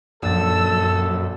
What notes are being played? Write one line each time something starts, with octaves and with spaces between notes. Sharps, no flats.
A#1 F#2 A4 E6 A6